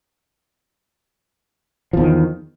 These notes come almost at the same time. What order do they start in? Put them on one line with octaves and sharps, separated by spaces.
F3 E2 D#3